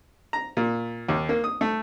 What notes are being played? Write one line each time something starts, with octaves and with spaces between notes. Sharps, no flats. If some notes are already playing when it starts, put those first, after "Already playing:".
A#5
A#2
D#2
A#3
D#6
A3